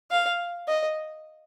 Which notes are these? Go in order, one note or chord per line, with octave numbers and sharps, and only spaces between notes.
F5
D#5